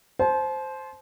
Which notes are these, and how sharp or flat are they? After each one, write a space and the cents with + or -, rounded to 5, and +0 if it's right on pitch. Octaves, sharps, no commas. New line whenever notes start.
C5 +0 A5 -40